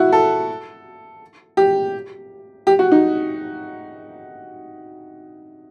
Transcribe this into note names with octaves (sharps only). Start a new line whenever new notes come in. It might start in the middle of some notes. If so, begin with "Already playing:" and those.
Already playing: E4 F#4
A4
G4
G4
F#4
D#4